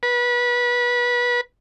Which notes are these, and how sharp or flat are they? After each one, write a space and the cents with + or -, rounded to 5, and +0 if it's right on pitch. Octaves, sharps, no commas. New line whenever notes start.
B4 -25